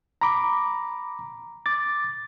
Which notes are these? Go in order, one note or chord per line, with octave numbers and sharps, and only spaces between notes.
A#5 B5 D6
D6 A6